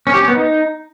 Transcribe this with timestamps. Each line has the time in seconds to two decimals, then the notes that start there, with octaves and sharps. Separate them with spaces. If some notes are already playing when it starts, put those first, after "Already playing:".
0.07 C#4
0.14 G4
0.21 C#4
0.28 B3
0.35 D#4